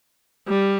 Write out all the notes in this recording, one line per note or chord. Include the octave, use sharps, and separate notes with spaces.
G3